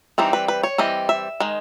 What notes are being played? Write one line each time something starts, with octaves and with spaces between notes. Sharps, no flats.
E3 G3 C4 D#4
B4
B4
C#5
E3 G3 C4 D#5
E5
D#3 G#3